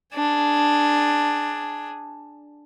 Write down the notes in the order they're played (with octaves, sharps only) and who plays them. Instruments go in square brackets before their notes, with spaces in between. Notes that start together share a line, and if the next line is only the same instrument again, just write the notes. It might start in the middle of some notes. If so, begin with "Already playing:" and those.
[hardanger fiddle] D4 G#4